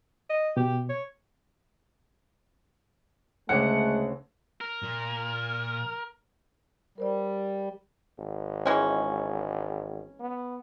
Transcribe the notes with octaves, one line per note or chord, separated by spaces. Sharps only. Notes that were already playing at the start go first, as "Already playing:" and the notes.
D#5
B2 G4
C#5
D2 C#3 G#3 A3 F#5 D6
A#4
A#2
G3 A#4 C5 D5
G#1
E3 G#3 C#4
B3